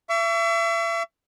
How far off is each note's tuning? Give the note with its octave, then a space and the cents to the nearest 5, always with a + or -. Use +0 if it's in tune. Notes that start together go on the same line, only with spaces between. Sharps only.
E5 +35 C#6 +40